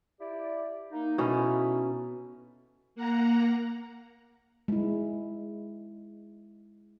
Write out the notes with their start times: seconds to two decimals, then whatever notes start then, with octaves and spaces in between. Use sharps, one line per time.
0.20 E4 G4 D5
0.92 A#3 D#4
1.18 B2 A3 C#4 D#4 E4
2.95 A#3 F#5 A#5
4.68 G#3 E4